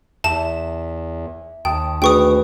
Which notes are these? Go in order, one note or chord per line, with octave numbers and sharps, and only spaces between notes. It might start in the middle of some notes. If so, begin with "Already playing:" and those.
E2 E5 A5 E7
D#2 G5 A5 D#6
D2 G#4 B4 G5 C#6 D#6